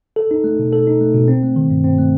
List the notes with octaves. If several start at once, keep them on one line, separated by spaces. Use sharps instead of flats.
A4
D#4
A3
B2
A4
D#4
A3
B2
C4
A3
D#3
G2
C4
A3